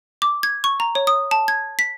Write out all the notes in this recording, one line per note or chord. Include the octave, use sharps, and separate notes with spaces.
D6
G#6
C#6
A#5
C#5
D#6
A5
G#6
B6